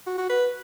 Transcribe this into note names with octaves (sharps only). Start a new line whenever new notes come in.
F#4
F#4
B4